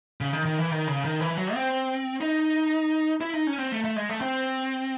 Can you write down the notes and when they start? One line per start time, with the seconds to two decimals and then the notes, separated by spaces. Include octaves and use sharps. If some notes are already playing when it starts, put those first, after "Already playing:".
0.21 C#3
0.33 D#3
0.45 D#3
0.59 E3
0.71 D#3
0.87 C#3
1.05 D#3
1.21 E3
1.38 F#3
1.54 C4
2.21 D#4
3.21 E4
3.33 D#4
3.47 C#4
3.58 C4
3.72 A3
3.84 A3
3.96 G#3
4.09 A3
4.21 C4